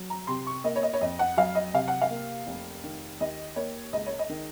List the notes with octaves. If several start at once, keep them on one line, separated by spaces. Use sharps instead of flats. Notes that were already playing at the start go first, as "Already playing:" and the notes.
Already playing: F#3
A#5
C3 C6
C#6
A#3 D#5
C#5
D#5
C#5
F2 D#5
F#5
F#3 F5
D#5
C3 F5
F#5
F5
A#3
F1
D#3
D#2 D#5
A#3 C#5
C#2 D#5
C#5
D#5
D#3